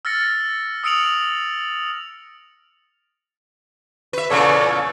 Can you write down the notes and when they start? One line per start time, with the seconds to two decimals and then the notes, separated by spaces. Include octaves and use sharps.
0.05 E6 F6 A6 A#6 C#7
0.83 D#6 E6 C#7 D7 F7 F#7
4.13 B4 E5
4.30 E2 A#2 C#3 A4 C#5 D5